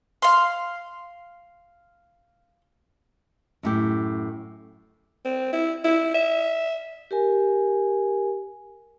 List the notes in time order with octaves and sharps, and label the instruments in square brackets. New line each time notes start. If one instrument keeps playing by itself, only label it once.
[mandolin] F5 C6
[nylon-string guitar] F#2 A2 G4
[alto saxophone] C4
E4
E4
E5
[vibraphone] G4 A#4 G#5